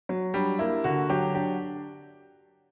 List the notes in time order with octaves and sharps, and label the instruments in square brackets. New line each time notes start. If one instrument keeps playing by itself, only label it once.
[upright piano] F#3
[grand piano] G3 [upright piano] D4
[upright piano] A#3 [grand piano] E4
[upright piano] D3 [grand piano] F#4
[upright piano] F#3 [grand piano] G4
[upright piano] D4 [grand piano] G4